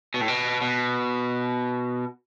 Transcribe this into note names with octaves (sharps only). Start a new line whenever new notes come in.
B2
A2
B2
B2